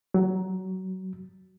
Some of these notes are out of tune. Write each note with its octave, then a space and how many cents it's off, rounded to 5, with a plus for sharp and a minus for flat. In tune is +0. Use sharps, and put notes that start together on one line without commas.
F#3 +20